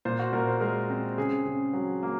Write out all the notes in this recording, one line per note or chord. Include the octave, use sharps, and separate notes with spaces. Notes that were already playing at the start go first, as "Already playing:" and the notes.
A#2 C5
F#4
A#2 A#4
C5
G#3 A#4
C4
C#3 G#4
C#3
F#3
A#3